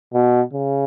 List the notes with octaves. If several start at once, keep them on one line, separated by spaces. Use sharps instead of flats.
B2
C#3